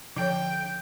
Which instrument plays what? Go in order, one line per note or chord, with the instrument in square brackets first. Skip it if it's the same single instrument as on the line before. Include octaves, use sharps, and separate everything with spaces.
[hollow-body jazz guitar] D3 [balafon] F3 C#5 [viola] G5